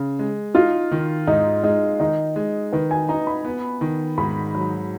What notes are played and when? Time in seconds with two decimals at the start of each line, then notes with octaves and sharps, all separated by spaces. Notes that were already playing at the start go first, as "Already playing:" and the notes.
Already playing: C#3
0.19 G#3
0.54 D#4 F4
0.91 D#3
1.27 G#2 D#4
1.63 G#3 D#4
1.99 D#3 D#4
2.36 G#3
2.73 D#3 B4
2.91 G#5
3.09 D#4 A#5
3.27 B5
3.45 B3
3.81 D#3
4.18 G#2 B5
4.54 F#3